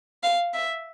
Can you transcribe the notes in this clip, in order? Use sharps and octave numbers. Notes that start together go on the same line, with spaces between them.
F5
E5